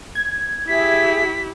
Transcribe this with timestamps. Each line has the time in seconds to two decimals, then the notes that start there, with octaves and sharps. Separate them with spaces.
0.15 G#6
0.68 E4 G4 G#4 E5 B6